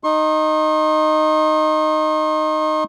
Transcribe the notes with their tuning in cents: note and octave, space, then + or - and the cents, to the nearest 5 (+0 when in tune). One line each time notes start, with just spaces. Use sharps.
D#4 -5 C6 +45